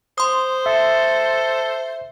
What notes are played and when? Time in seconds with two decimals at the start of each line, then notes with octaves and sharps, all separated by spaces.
0.18 C5 C6 D#6
0.66 A4 E5